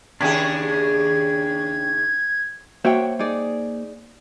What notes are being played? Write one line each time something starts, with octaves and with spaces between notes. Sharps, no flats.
D#2 C#3 D4 G4 G#4 G#6
A#3 F#4 C5 C#5 E5 G5
D#4 G#4 D5